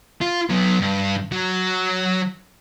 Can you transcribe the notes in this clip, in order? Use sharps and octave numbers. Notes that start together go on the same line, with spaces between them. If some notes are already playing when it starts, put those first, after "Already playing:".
F4
F#3 B3
G2
F#3